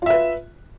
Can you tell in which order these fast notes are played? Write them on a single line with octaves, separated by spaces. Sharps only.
F4 E5 B4